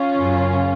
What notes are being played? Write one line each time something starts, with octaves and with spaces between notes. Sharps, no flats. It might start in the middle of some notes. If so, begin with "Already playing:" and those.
Already playing: C#4 F4
F#2 C#3